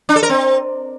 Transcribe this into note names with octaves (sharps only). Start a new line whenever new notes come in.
D4
A4
A#4
C4